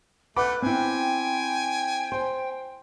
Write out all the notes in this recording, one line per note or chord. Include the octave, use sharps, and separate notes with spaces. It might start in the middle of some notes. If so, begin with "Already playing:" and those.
A3 B4 F#5 B5 D6
C4 E4 G5 G#5
C5 G#5